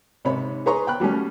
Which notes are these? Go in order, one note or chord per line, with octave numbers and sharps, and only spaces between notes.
G#2 C3 D#4 C#5 B5
G#4 B4 C#5 A#5 C6 C#6
G5 B5 F#6
F#3 G3 A3 C#4